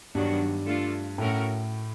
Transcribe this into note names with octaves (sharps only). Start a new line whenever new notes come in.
G2 D#3 F#3 B3 D4 F#4
A3 D4 F4 A4
A2 A3 C#4 F#4 A#4